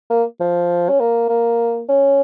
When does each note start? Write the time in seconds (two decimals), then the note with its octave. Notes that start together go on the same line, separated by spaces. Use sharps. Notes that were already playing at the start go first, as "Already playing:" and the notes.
0.10 A#3
0.40 F3
0.89 C#4
1.00 A#3
1.29 A#3
1.89 C#4